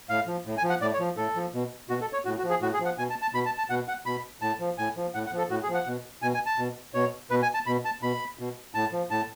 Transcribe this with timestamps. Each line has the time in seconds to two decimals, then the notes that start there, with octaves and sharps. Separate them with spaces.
0.09 A2 F5
0.27 F3
0.45 A2
0.58 G#5
0.63 F3
0.70 F#5
0.81 A2 D5
0.94 C#5
0.99 F3
1.17 A2 A4
1.36 F3
1.53 B2
1.89 B2 F#4
2.01 A4
2.13 C#5
2.25 A2 F#4
2.38 F#4
2.43 F3
2.50 G#4
2.61 A2 F#4
2.74 G#4
2.80 F3
2.85 F#5
2.98 B2 G#5
3.10 A5
3.22 A5
3.34 B2 B5
3.46 A5
3.58 A5
3.70 B2 F#5
3.88 F#5
4.06 B2 B5
4.41 A2 A5
4.60 F3
4.78 A2 G#5
4.97 F3
5.14 A2 F#5
5.26 F#5
5.33 F3
5.38 A4
5.50 A2 F#4
5.63 G#4
5.69 F3
5.74 F#5
5.87 B2
6.22 B2 G#5
6.34 G#5
6.46 A5
6.58 B2
6.94 B2 C#5
7.31 B2 B4
7.42 G#5
7.54 A5
7.66 B2 B5
7.85 A5
8.02 B2 B5
8.39 B2
8.74 A2 A5
8.92 F3
9.11 A2 A5